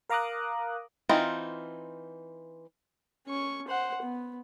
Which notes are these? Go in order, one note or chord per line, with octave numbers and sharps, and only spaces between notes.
A#4 F5 A#5 D6 D#6 F#6
E3 C4 D#4 F4
C#4 C#6
C5 F#5
B3